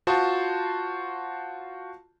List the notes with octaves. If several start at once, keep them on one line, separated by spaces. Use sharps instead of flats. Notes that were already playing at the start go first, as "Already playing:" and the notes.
F4 F#4 C5 A5 C6 D#6